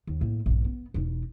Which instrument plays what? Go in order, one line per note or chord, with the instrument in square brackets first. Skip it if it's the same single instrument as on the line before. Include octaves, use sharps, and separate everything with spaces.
[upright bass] D#2
A2 A#3
A#1 G2
B3
E1 D#4